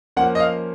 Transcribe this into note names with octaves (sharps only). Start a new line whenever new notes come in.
F3 A#3 C#4 F#5
D#5
F5